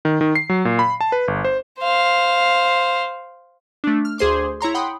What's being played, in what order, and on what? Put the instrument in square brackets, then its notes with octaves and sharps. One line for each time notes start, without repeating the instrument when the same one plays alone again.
[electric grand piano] D#3
D#3
C7
F#3
A#2
B5
A5
B4
G1
C5
[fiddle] C5 F5
[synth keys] A3 D4
F6
D2 G#4 C5 C6 D6
E4 C#5 A#5 C6
F#5 G5 B5 C6 D#6